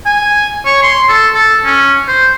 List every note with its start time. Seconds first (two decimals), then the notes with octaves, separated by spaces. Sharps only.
0.06 G#5
0.65 C#5
0.82 C6
1.09 A4
1.34 A4
1.65 C#4
2.08 C5